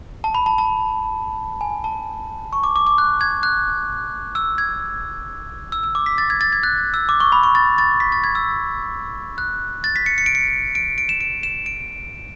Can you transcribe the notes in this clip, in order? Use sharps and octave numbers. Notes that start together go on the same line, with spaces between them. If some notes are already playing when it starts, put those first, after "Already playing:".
A5
B5
A5
A5
G#5
A5
C#6
D6
D6
D6
F#6
G#6
F#6
E6
G#6
E6
E6
D6
B6
A6
G#6
A6
G#6
F#6
E6
D6
C#6
B5
C#6
A6
A6
B6
A6
G#6
E6
F#6
A6
B6
C#7
C#7
D7
C#7
D7
D7
E7
D7
E7
D7